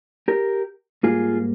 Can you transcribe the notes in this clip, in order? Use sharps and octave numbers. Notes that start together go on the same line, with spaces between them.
G4 A#4
G#2 G3 A#3 F4 G#4